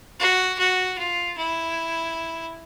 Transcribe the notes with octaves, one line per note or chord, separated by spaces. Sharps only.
F#4
F#4
F4
E4